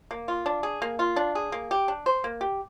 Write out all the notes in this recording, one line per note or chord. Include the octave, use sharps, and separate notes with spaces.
A#3
F4
D4
G#4
A#3
F4
D4
G#4
A#3
G4
D4
C5
A#3
G4